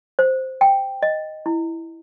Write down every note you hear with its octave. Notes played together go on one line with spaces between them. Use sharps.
C5
G5
D#5
E4